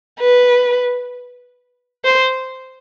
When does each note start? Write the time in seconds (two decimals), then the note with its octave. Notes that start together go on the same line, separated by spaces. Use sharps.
0.20 B4
2.05 C5